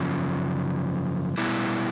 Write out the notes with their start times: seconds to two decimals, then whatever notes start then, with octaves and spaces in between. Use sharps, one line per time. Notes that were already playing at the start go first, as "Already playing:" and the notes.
Already playing: F#2 C#3 F3
1.38 B2 G3 B3 E4